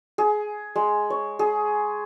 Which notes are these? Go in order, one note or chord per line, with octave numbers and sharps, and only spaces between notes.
G#4
G#3
C#5
G#4